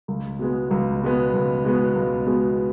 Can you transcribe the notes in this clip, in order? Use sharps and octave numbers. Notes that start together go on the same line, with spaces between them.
C#2
B2 G#3 B3
C#2
B2 G#3 B3
C#2
B2 G#3 B3
C#2
B2 G#3 B3